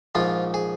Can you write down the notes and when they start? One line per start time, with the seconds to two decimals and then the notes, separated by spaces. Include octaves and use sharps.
0.15 A#1 G#2 F3 F4
0.54 G#4